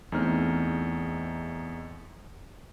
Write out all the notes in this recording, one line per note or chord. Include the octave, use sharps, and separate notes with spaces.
E2 A3 C4 D#4 D#5 F6